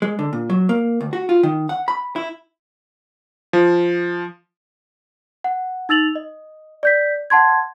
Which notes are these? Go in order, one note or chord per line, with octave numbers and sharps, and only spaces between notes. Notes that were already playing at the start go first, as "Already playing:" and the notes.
G#3
D3
A#2
F#3
A#3
D2
F#4
F4
D#3
F#5
B5
E4
F3
F#5
D#4 E6 A6 F7 F#7
D#5
D5 G6 B6
F#5 A5 C6 G#6